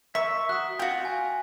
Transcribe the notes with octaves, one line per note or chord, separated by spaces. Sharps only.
A#4 E5 C#6 B6
F#4 D#6 F#6
F4 F#4 G5
G#5